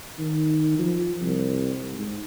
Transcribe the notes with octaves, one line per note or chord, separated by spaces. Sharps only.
D#3
F3
C2
G#2